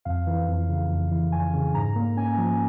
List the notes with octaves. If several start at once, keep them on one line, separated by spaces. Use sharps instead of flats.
F2 F5
E3
F2
C#3
F2
E3
F2 G#5
C#3
G#2 A#5
A#3
C#4 G#5
F3